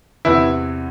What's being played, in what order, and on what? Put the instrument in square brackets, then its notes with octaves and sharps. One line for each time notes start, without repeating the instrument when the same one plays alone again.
[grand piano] E2 C3 E3 E4